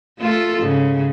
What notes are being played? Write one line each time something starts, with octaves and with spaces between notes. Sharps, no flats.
A3 F4 A4
G#2 C#3